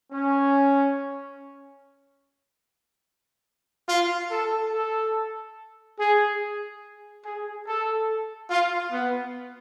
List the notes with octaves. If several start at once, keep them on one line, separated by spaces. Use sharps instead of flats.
C#4
F4
A4
A4
G#4
G#4
A4
F4
B3